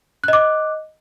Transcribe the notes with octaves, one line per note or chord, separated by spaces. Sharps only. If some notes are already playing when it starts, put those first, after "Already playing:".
D#5 D6 F#6